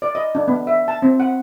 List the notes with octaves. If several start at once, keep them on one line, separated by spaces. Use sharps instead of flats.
D5
D#5
D4
B3
E5
A5
C4
F#5